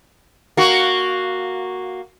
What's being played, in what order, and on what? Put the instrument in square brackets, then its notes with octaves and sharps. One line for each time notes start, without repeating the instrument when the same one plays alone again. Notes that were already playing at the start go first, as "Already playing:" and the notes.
[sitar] A#3 F#4